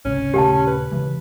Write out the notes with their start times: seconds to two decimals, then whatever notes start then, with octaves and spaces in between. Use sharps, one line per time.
0.05 G#1 C#2 C3 C#4
0.34 D#1 C#3 A3 G4 G5 A5
0.67 B4
0.92 C#3 E3 G#3